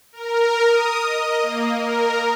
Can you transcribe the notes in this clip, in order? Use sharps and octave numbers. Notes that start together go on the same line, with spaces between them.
A#4
D#6
D#5
A#3
A#4